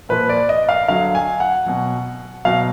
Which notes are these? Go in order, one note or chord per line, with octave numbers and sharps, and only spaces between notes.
A#2 F3 B4
D5
D#5
F5
D3 F#3 F5
G#5
F#5
B2 F#3
B2 F#3 F5